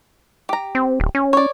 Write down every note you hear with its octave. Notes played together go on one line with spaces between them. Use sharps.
G4 A#5
C4
D1
C#4
C#5 D5